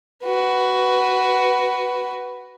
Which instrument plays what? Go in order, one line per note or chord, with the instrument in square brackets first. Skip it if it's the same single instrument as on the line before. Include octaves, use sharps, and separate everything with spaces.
[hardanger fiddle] F#4 B4